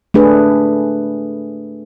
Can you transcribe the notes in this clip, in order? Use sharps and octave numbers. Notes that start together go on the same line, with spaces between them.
A3 D4 G#4 B4